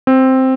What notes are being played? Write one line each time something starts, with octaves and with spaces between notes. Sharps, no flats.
C4